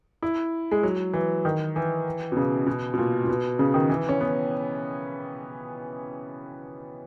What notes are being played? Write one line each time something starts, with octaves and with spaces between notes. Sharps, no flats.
E4
G#3
F#3
E3
D#3
E3
B2
C#3
B2
B2
A#2
A#2
B2
C#3
D#3
E3
C#4
B3